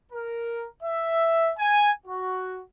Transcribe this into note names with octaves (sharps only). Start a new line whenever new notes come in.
A#4
E5
G#5
F#4